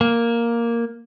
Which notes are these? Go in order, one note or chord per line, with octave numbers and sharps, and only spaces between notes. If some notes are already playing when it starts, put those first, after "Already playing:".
A#3